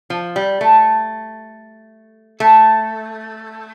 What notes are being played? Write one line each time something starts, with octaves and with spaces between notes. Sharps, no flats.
F3
G3
A3
A3